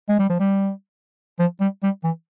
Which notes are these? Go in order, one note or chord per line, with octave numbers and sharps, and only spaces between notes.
G#3
G3
F3
G3
F3
G3
G3
E3